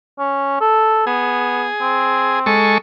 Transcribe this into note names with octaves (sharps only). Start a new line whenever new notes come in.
C#4
A4
B3 G#4
C4
G#3 A4 C#6